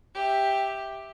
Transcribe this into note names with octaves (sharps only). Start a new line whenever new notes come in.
G4 E5